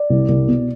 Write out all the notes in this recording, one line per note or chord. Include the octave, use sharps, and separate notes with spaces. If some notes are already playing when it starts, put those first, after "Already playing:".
Already playing: D5
C2
C2
B2